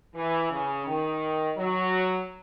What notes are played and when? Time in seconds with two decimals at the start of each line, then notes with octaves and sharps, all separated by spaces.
0.15 E3
0.50 C#3
0.86 D#3
1.57 F#3